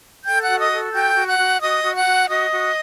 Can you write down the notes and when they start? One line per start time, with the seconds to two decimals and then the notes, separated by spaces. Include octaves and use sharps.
0.25 A4 G5 G6
0.42 F#5 F#6
0.48 F#4
0.59 D#5 D#6
0.71 A4
0.93 F#4 G5 G6
1.16 F#4
1.27 F#5 F#6
1.38 F#4
1.61 F#4 D#5 D#6
1.84 F#4
1.94 F#5 F#6
2.06 F#4
2.28 F#4 D#5 D#6
2.52 F#4